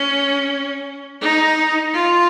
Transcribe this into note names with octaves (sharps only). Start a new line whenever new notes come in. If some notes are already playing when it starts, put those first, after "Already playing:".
Already playing: C#4
D#4
F4